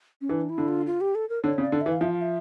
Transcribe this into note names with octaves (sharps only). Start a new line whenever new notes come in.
C#4
E3 D4
E4
D3
F4
F4
G4
A4
A#4
D3 C#5
C#3
D5
D3
E3 E5
F5
F3 E5
F5
E5